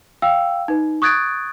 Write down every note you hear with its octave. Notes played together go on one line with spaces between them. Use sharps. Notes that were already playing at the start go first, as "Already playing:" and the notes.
F5 G5 E6
D#4 B4
C#6 D#6 F#6 G#6 A6 D7